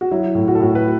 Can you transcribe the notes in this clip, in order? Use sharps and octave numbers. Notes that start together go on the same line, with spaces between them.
F#4
F#3 E4
A2
F#4
A4
A2 F#4
B4